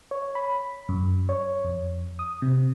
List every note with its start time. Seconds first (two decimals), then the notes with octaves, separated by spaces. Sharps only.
0.11 C#5
0.35 B5
0.89 F#2
1.29 C#5
1.64 F2
2.19 D#6
2.42 C3